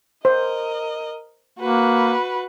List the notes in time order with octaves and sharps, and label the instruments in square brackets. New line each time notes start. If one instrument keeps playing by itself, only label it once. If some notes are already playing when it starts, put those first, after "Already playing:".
[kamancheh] A#4 D#5 [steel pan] C5
[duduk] A#3 [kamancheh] F#4 B4